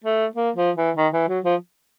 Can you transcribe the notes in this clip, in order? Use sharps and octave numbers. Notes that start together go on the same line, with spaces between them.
A3
A#3
F3
E3
D#3
E3
F#3
F3